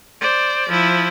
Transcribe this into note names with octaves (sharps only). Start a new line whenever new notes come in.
C5 D5
F3 E4